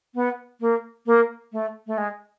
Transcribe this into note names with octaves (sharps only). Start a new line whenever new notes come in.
B3
A#3
A#3
A3
A3
G#3